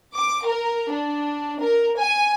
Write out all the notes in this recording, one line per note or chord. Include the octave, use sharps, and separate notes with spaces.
D6
A#4
D4
A#4
G#5